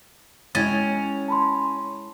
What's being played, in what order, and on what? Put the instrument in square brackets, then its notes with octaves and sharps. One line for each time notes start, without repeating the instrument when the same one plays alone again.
[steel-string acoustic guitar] G#3 E4 G5 [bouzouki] C#4 [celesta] C#5 G#6 A6
[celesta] A5 B5 C6